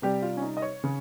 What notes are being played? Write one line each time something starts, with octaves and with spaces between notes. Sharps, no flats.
C3 G3 G4
F4
C#4
D#4
D#5
C#5
C#3